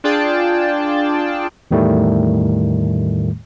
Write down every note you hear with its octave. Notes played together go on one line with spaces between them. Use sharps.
D4 F4 G#4 D5 G5 A5
E2 A2 D#3 G3 A3